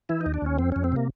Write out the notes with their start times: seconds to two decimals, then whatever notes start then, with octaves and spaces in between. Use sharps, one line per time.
0.09 E3 E4
0.21 D#4
0.26 D#2
0.34 D4
0.42 D#2 C#4
0.59 F2 C4
0.72 F2 C#4
0.84 C4
0.92 C3 A#3